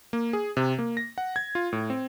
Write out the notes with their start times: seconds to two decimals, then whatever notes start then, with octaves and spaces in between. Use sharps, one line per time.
0.13 A#3
0.33 G#4
0.57 C3
0.79 A#3
0.97 A#6
1.18 F#5
1.36 G#6
1.55 F4
1.73 A2
1.90 C4